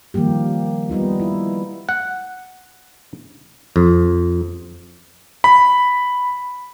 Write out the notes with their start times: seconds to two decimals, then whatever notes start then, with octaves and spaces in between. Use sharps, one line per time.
0.14 D#3 F3 G3 A#3 G4
0.90 G3 B3 D#4 F4
1.20 E4
1.89 F#5
3.76 F2
5.44 B5